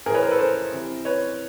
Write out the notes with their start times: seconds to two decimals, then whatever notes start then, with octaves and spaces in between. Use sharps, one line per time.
0.06 A2 G#4 A#4
0.10 E3 B4 C#5
0.23 A#4 C5
0.31 A4 B4
0.39 A#4 C5
0.73 C3 E3
1.05 B4 C#5